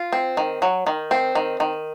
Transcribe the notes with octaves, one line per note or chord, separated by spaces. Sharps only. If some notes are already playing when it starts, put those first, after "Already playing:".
Already playing: F4
C4
D#3
F#3
D#3
C4
D#3
D#3